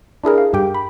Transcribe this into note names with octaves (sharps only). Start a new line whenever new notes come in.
D4 E4 G#4 A#4
F5
G2 G4 G5
B5